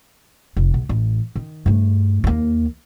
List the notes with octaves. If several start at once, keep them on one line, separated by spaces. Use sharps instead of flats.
F1
B1
A1
D#3
G2 A3
D#2 A#3